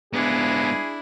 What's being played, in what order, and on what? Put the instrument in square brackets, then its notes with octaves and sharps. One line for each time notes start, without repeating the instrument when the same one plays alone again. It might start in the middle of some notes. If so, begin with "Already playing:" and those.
[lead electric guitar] G#2 B3 [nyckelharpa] D4 E4 [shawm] G#4